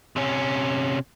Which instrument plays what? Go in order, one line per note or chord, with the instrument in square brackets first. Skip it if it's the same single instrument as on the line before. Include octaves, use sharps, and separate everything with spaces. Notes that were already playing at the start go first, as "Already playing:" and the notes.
[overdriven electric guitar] C3 C#4